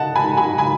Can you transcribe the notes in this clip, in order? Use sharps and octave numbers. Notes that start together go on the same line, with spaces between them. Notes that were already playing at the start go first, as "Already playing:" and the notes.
Already playing: D#5 F#5 A5
G#5 B5
G#5 B5
G#5 B5